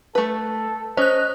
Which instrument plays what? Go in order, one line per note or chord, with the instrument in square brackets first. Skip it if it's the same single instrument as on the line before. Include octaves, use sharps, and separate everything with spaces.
[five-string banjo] A3 B4 [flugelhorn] A4
[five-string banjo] C#4 [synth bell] C5 F#6 [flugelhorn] D#5